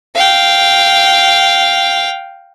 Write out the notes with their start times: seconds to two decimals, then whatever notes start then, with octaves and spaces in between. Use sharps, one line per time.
0.15 F5 G5